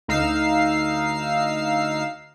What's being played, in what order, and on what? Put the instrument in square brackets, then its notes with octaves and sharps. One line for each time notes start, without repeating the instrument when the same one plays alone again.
[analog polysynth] D2 D#4 F5 E6 C7